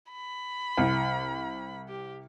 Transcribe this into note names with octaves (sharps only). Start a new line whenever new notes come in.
B5
C2
G4